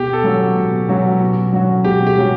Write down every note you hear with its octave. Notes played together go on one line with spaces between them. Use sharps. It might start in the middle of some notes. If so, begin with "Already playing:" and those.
Already playing: B2 G4
A4
F#3 C#4 F#4
B2
F#3 C#4 F#4
B2
F#3 C#4 F#4
B2 G4
G4
F#3 C#4 F#4